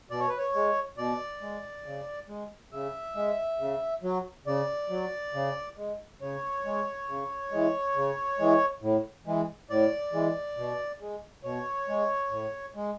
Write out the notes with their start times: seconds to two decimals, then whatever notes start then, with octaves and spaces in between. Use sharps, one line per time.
0.11 B2 D5
0.20 C#5
0.29 B4
0.38 C#5
0.55 G#3
0.97 B2 D5
1.41 G#3
1.85 C#3
2.28 G#3
2.72 C#3 E5
3.15 G#3
3.59 C#3
4.03 F#3
4.46 C#3 D5
4.90 F#3
5.34 C#3
5.77 G#3
6.21 C#3 C#5
6.65 G#3
7.08 C#3
7.51 E3 G#3
7.96 C#3
8.39 E3 G#3
8.82 A2
9.26 E3 G#3
9.70 A2 D5
10.13 E3 G#3
10.57 B2
11.00 G#3
11.43 B2 C#5
11.88 G#3
12.31 A2
12.75 G#3